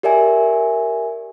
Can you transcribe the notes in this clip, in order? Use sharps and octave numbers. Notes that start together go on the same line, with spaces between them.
G4 A#4 D5 E5 G#5